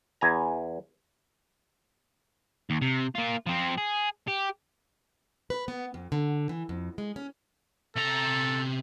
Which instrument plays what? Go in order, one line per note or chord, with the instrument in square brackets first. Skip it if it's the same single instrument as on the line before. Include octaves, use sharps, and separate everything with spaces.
[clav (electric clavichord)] E2 G#5 A#5
[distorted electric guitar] D#2
C3
A#3 F4
F3 C4
G#4
G4
[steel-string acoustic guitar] B4
B3
F2
D3
E3
F2
G#3
C#4
[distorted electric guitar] C3 A#5 [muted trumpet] A4